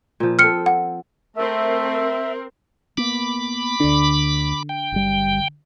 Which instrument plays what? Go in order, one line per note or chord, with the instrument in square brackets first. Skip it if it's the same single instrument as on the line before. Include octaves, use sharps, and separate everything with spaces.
[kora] A#2 F3
[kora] C4 A4 [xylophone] F6 C#7
[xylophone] F#5
[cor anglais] A3 [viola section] C4 A#4 [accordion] E5
[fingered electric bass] A#3 B3 [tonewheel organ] B5 D6
[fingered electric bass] D2 D4 [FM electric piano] D3
[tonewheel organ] G5
[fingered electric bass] F#1 G3